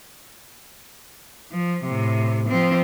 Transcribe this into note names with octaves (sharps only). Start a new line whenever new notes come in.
F3
A2 C3
F3 C4